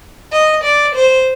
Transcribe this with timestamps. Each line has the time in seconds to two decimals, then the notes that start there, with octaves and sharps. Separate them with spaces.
0.32 D#5
0.64 D5
0.95 C5